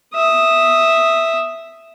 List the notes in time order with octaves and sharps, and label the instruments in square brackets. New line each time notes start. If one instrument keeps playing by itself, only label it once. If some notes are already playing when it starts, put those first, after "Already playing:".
[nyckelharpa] E5 D#6